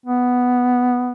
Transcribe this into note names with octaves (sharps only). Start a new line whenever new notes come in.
B3